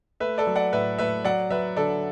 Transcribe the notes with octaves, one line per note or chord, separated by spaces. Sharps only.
A3 B4 E5
A4 D5
F#3
D5 F#5
A2 B4 E5
A2 B4 E5
F#3 D5 F#5
F#3 B4 E5
D3 A4 D5